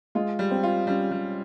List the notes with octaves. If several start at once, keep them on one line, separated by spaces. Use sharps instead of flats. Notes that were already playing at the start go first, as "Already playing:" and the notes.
G#3 F4
G3
C4
F4
G3 C#4
G3